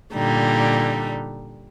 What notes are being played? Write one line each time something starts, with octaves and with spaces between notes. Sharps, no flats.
A#2 D3 G3 D#4